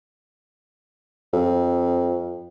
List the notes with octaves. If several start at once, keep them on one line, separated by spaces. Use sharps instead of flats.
F2